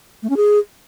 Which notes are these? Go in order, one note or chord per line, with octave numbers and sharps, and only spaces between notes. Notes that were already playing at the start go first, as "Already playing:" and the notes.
A3
C#4
G#4